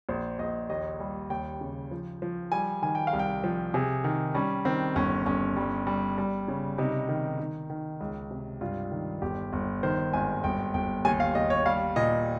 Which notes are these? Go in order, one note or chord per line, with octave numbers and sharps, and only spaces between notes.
A#1 C5
A#1 D#5
D#2 D#5
G3
D#2 G5
C#3
F3
F3
G3 G#5
D#3 G#5
G5
F5
C2
G5
F3
C3 G#4
D#3
G3 C#4
D#3 C4
G1 C#4
G1 C#4
G3
G3
G3
C#3
C3 D#4
D#3
D#3
D#3
C#2
C3
G2 F4
D#3
G1 G4
G1
D#3 C5
G#1 G#5
G1 G5
G1 G5
D#2 G#5
F5
D#2 D#5
C#5
G3 F5
A#2 D#5